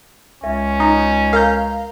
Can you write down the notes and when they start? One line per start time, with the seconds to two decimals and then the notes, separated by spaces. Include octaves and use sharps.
0.44 C#2 C#4 E5
0.80 D#4
1.33 A#4 F5 A#5 G6